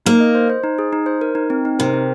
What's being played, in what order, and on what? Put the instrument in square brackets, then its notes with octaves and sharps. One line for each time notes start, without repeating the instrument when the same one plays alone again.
[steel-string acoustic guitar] A#3 [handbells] D#4
[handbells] D#5
C5
C5
D#4
G#4
D#4
C5
A#4
D#4
C4
D#4
[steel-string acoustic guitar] C3 [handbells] A#4
[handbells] C4